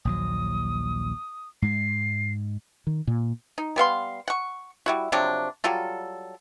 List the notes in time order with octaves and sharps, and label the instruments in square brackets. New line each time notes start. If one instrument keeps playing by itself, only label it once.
[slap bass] A#1 D#2 F#3 [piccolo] D#6
[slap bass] G#2 G#3 [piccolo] C7
[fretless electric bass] D#3
A#2
[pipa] D#4
G3 B3 F5 C6
F#5 C#6
G3 E4 F#4
C3 F3 F#3 D4
F#3 G3 F4 A4